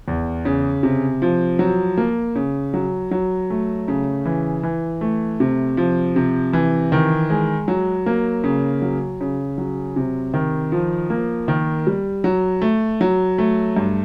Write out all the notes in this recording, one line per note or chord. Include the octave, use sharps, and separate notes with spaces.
E2
C#3
C3
F3
F#3
A#3
C#3
F#3
F#3
A3
C#3
E3
E3
A3
C3
F3
C3
E3
D#3
G#3
F#3
A#3
C#3
F#3
C#3
F#3
C3
D#3
F3
A#3
D#3
G3
F#3
A3
F#3
A3
G2